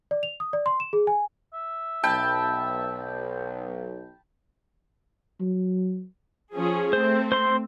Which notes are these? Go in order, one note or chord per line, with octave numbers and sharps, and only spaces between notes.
D5
F7
D#6
D5
C6
E7
G#4
G#5
E5
B1 G5 A5 B5
F#3
F3 C#4 G#4
A3 C4 C5
C5 C6